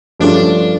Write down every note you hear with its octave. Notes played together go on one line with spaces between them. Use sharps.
G2 F3 A3 C#4 D4 F4